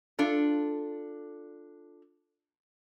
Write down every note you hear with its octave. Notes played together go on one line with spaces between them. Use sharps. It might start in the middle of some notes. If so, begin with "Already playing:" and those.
D4 F4 A4